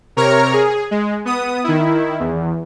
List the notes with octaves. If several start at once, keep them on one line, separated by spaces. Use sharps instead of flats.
C3 A#4 C#5 A#5 F6
G#4
G#3
B3 D#6
D#3 E4
E2